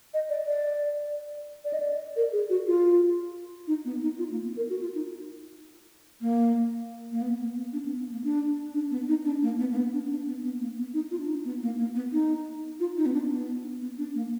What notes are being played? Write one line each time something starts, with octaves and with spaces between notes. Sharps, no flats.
D#5
D5
D5
D5
D#5
D5
A#4
G#4
F#4
F4
D#4
B3
D#4
F4
A#3
B3
A#4
F#4
F4
D#4
A#3
A#3
B3
A#3
B3
D4
B3
B3
A#3
D4
D4
B3
D#4
D4
A#3
B3
A#3
B3
D4
D4
B3
B3
A#3
B3
D#4
F4
D4
D#4
B3
A#3
A#3
B3
D#4
F4
D#4
B3
D4
B3
B3
D4
A#3